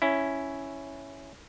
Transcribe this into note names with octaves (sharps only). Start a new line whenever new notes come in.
C#4 E4